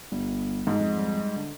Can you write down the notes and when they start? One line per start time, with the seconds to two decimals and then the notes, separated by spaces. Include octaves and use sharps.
0.11 G1 G3
0.67 G#2 G#3
0.79 F2
0.97 G3
1.36 D3